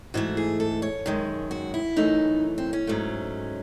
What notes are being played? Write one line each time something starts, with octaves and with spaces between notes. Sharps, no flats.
G#2 E3 A3 F#4
G#4
A4
C#5
F#2 D#3 G#3
F#4
E4
F#2 E3 A3 D#4
C4
C#4
G#2 F#3 A3